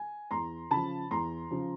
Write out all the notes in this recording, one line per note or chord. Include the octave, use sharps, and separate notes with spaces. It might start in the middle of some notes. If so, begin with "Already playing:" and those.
Already playing: G#5
E2 A#5 C6
C#3 F3 A5 B5
E2 A#5 C6
C#3 F3